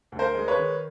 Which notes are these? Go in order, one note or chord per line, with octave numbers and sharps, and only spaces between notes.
D2
A#4 C5
G#3
B4 C#5
D#3